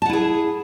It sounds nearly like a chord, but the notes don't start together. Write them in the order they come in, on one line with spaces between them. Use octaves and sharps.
A5 F#5 E4 G#4